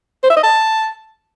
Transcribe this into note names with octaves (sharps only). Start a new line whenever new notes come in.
C5
E5
D#5
A5